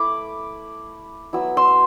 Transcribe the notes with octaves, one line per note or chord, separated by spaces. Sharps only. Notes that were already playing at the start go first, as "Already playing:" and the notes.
Already playing: A3 E4 B5 D6
F#3 B3 E4 E6
C6 E6